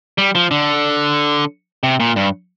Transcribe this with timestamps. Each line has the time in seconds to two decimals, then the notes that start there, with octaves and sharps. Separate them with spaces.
0.18 G3
0.35 F3
0.51 D3
1.83 C3
2.00 A#2
2.16 G2